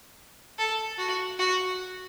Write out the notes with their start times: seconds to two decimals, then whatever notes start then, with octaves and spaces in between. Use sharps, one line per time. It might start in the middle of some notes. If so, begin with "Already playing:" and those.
0.58 A4
0.98 F#4
1.39 F#4